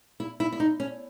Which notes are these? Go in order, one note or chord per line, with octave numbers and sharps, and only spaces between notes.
E4
E4
E4
D#4
C#4